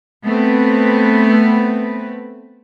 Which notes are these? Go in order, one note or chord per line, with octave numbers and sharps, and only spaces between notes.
A3 B3 C4 B4